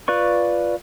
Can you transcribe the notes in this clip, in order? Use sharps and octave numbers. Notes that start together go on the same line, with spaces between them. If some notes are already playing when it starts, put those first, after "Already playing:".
F4 B4 D5 C#6